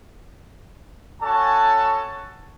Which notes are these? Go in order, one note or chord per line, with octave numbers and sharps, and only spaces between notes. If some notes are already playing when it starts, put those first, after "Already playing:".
C#4 F#4 A4 C#5 G#5 A5